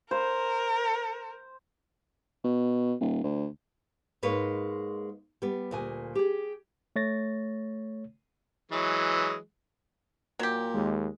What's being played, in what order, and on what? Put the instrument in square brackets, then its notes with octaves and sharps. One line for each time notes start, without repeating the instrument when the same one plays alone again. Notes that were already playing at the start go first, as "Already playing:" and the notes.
[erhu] A#4 [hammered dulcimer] C5
[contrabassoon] B2
D#1
D2
[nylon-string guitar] G#2 G#3 A#3 B4 C#5
G3 B3
D2 A#2 G#5
G4 G#4
[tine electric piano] A3 C#5 A6 A#6
[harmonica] E3 F#3 G#3
[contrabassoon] A#2 [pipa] F#3 G4
[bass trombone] D#2 [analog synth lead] G#3